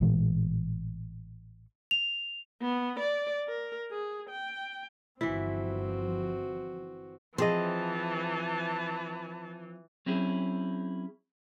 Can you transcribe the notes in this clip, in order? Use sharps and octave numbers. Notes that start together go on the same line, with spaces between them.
A1 A#2 E3 G#3
F7
B3
D5
A#4
G#4
G5
G1 E3 F3 C4 E4 F#4
E3 F3 C4 G#4 D#5 A5
F#3 C4 C#4 E4 G#4